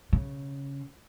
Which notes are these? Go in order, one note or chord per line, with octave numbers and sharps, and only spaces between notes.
C#3